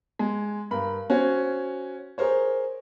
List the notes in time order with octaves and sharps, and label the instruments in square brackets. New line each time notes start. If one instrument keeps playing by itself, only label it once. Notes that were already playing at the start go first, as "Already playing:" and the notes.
[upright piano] G#3
G2 A#4 B5
C#4 F#4 C5
G#4 A#4 C5 C#5